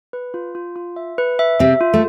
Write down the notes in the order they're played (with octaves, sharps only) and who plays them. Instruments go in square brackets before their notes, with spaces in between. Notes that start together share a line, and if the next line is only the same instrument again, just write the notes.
[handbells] B4
F4
F4
F4
E5
B4
E5
[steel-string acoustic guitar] C3 C4 [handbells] E5
[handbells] F4
[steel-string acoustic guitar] A3